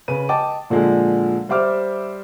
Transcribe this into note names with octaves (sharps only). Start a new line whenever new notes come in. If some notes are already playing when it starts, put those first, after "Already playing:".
C#3 B4 D#7
D#5 G5 A5 D6
A#2 D3 F3 G#3
G3 C5 E5 D6 F6